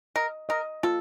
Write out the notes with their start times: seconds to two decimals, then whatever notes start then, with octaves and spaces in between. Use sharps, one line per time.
0.16 A#4 D#5
0.49 A#4 D#5
0.83 F4 A4